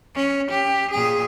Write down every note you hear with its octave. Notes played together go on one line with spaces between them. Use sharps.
C#4
G4
A#2 G#4